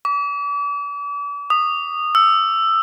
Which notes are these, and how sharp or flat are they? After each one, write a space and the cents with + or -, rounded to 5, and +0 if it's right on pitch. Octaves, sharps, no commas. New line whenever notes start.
D6 -40
D#6 -20
E6 +10